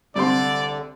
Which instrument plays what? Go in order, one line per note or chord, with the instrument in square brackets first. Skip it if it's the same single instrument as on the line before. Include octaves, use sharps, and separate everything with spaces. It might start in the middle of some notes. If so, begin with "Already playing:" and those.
[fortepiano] C2 C4 C6 [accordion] D3 [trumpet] D5